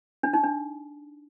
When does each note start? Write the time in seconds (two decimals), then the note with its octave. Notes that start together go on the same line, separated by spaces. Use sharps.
0.23 D4
0.33 D#4
0.44 D4